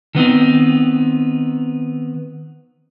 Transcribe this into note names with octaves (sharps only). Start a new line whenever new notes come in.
D#3 B3 C4 D#4